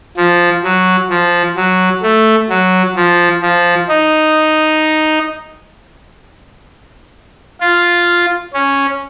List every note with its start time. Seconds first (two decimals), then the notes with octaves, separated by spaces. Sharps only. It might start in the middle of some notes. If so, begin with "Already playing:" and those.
0.17 F3
0.63 F#3
1.10 F3
1.56 F#3
2.03 A3
2.49 F#3
2.96 F3
3.42 F3
3.89 D#4
7.60 F4
8.54 C#4